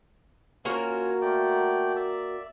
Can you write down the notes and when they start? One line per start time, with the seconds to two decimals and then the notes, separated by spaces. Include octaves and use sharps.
0.65 A#3 C#4 F4 F#4 A#4 C#5
1.21 A3 D5 G5
1.96 D5 E5